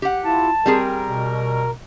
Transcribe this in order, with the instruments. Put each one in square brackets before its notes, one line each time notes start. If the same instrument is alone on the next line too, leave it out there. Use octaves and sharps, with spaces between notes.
[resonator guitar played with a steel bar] G4 F#5
[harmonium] E4 F4 [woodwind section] A5
[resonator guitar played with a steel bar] G3 C4 G#4 [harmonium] A#4
[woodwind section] B2